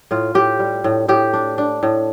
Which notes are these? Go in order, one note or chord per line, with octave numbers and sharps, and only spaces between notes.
A2 F4
A2 G4
G3
A2
A2 G4
D4
D4
A2